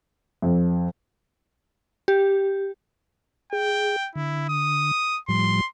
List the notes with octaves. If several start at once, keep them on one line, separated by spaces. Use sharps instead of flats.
F2
G4
G#4 G5
D3 E4
D#6
A2 F3 G3 C6